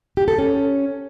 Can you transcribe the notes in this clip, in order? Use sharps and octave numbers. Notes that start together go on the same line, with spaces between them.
G4
A4
C#4